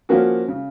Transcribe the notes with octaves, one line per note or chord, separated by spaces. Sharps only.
F3 A#3 C#4 F#4
C#3